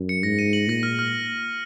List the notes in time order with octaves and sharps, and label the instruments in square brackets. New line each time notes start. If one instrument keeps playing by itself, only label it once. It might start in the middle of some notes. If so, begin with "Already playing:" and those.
Already playing: [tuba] F#2
[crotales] C#7
[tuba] G#2 [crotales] A#6
[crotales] D#7
F#7
[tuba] A#2 [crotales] A#6
[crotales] F6
F6